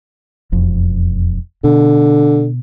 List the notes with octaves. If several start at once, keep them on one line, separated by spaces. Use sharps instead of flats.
E1 F2
B2 D3